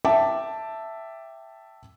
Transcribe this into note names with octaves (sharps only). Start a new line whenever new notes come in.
E5 G5 A5 D6